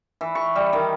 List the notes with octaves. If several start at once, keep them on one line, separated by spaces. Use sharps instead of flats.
E3
C#6
G3
D#3